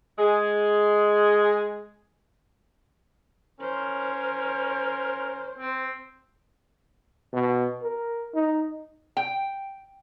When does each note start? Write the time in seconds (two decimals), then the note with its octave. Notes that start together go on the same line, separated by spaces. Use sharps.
0.18 G#3 G#4
3.60 C#4 A#4 C5
5.59 C4
7.33 B2
7.82 A#4
8.34 D#4
9.17 G5